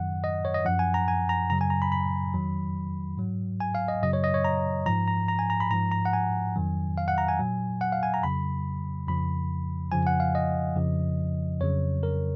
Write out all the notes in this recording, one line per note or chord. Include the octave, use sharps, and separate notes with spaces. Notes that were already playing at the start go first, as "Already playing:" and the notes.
Already playing: F#2 D#3 F#3 F#5
D#5
C#5
D#5
F#2 F3 F#5
G#5
A#5
G#5
A#5
F#2 C#3 F#3 A#5
G#5
A#5
B5
B5
F2 D#3 F#3
G#2 F#3
G#5
F5
D#5
F#2 C#3 F#3 D#5
C#5
D#5
C#5
A#5
G#2 F3 A#5
A#5
A#5
G#5
A#5
B5
G#2 F3 A#5
A#5
F#5
G#5
F2 D#3 F#3
F5
F#5
A#5
G#5
A#2 F#3
F#5
F5
G#5
A#5
F2 C#3 F#3 B5
F2 C#3 F3 B5
F2 C#3 F3 G#5
F#5
F5
D#5
F2 C#3 F3
F2 C#3 F#3 C#5
A#4